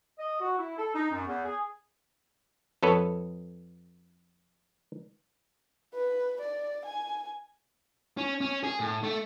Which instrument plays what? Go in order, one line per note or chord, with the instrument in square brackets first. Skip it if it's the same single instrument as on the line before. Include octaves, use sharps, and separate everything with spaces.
[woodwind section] D#5
F#4
E4
A4
D#4
F#2
E2
G#4
[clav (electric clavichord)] F2 A4 B4 C#5
[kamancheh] B4
D5
G#5
[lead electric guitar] C#4
C#4
G#4
A2
A3